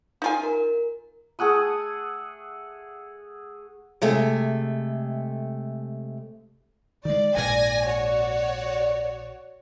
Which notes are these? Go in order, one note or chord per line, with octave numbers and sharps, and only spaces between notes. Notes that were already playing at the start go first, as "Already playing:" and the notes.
D#4 F4 G#5
A#4
A3 G#4 F#5 D#6
C3 G#3 A3
D#3 G#3 D5
A#1 G#2 D5 G#5 A#6
F#4 C#5 D5